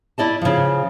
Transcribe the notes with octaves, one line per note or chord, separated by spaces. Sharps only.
E4 D5 D#5 A5
C#3 F3